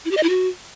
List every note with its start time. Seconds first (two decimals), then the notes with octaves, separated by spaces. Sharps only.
0.05 E4
0.11 G4
0.17 D#5
0.23 E4
0.29 F#4